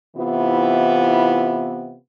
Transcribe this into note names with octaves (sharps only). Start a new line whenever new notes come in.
C3 E3 B3 E4 F4